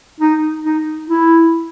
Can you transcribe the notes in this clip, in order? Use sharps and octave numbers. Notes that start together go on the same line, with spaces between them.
D#4
D#4
E4